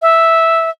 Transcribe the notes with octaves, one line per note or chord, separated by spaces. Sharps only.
E5